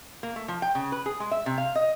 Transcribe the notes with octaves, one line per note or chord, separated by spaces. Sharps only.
A#3
A3
F3
G5
C#3
B4
G#4
G#3
E5
C3
F5
D#5